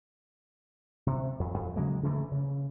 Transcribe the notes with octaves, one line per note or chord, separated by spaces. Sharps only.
C3
F2
F2
C#3 F#3 G#3 A#3
C#3 E3 A3 A#3
C#3